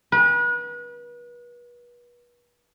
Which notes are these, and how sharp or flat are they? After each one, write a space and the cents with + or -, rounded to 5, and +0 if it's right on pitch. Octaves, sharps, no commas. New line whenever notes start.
B4 -35